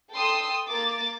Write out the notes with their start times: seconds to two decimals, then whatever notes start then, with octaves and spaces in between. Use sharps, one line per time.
0.12 A4 G5 C6 D#6 E6
0.67 A#3 D6 A6